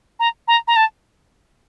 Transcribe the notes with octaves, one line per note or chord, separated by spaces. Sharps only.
A#5
A#5
A#5
A5